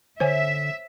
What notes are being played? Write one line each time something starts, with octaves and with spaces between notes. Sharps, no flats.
D3 C5 C#5 E5 G#5